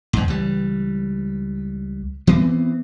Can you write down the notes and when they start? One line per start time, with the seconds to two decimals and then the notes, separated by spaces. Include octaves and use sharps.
0.13 E2 G#2
0.28 C#2 E3 G3
2.27 E3 B3 C4